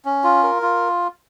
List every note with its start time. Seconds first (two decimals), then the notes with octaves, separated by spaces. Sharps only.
0.05 C#4
0.24 F4
0.43 A#4
0.62 F4